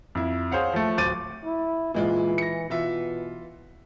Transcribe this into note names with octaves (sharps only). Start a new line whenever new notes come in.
F2 E4
G#4 C5 C#5 F5 F#5
F3 A3
D1 C5 D6 A6 D#7
E4
A#2 E3 G#3 F4
A#6 C#7
B2 E3 F4 E5